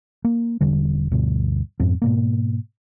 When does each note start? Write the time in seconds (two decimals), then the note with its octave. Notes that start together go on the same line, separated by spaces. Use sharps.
0.24 A#3
0.61 E1 D3 G3
1.11 D2 G2 B2
1.80 F2 G#2 C4
2.02 G#2 B2 A#3